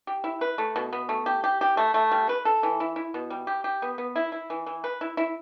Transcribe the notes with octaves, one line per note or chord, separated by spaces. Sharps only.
G4
E4
B4
A3
B2
B3
A3
G4
G4
G4
A3
A3
G3
B4
A4
E3
E4
E4
B2
G3
G4
G4
B3
B3
E4
E4
E3
E3
B4
E4
E4